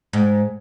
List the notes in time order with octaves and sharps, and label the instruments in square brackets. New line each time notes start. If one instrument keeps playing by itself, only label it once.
[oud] G#2